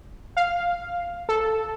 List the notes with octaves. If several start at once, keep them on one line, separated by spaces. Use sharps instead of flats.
F5
A4